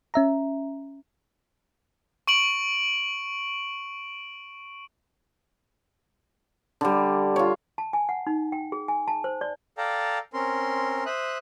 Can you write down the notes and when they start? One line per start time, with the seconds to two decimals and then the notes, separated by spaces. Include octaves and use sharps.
0.14 C#4 E5 A#5
2.27 C#6 D7 F#7
6.81 D3 G3
7.36 F4 C#5
7.78 A5
7.93 G#5
8.09 F#5
8.27 D#4
8.52 G5
8.72 G#4
8.88 G#5
9.08 A5
9.24 C5
9.41 D5
9.78 A4 D5 F5 G5 A5 A#5
10.34 C4 C#4 A#4 C6
11.06 C5 E5 D#6 F#6